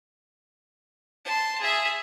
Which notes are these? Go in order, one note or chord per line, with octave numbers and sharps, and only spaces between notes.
A5 C6
G#4 E5